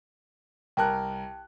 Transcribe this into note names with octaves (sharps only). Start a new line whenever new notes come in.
C2 A#4 G5 A5 F#6